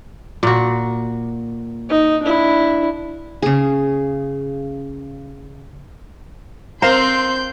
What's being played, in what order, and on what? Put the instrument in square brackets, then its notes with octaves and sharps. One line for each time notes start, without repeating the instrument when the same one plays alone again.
[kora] A#2 F#4
[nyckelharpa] D#4
D4 E4
[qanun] C#3 G#4
[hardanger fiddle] C4 [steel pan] A#4 F5 A#5 [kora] C5 [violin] C6 G6